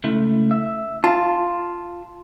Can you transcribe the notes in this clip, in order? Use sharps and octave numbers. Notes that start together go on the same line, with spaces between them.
C#2 A3 E4
E5
F4 A5